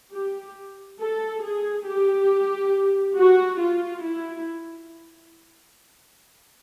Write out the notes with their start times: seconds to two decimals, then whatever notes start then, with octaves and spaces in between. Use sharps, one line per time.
0.13 G4
0.99 A4
1.43 G#4
1.87 G4
3.16 F#4
3.59 F4
4.03 E4